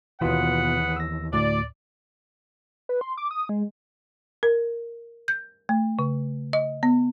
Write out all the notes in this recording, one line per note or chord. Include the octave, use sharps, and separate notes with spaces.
D#2 B2 E3 B3 F4 G#4 B4 F#5
E6 A#6
D2 A2 D5
B4
C6
D6
D#6
G#3
A#4
G6
A3
C#3
D#5
B3